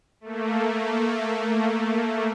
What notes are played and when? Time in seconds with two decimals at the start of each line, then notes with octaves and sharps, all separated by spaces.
0.21 A3 A#3